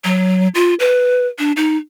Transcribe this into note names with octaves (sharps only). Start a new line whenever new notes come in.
F#3
F4
B4
D4
D#4